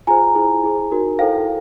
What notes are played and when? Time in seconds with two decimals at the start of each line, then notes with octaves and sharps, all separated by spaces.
0.07 F4 G#4 C5 G#5 A#5
0.35 E4 G#4 C5
0.63 E4 G#4 C5
0.91 D#4 F#4 A#4
1.19 E4 A4 C5 F5 G5